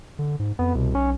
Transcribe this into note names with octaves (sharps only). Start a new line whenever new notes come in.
D3
G#2
F2 B3
C2 B2
B1 C#4